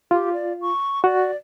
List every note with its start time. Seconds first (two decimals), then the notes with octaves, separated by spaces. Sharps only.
0.11 F4 G4
0.33 D5
0.61 C#6
1.04 F#4 D5